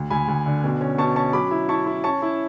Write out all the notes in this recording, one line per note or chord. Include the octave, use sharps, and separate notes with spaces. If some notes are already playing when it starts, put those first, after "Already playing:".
Already playing: D2
D2 G#5 B5
D2
D3
B2
C#4
B2 A5 C#6
C#4 A5 C#6
F#3 B5 D6
E4
E4 A5 C#6
E4
C#4 A5 C#6
E4